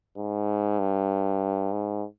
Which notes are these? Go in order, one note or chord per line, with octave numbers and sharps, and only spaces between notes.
G#2
G2
G#2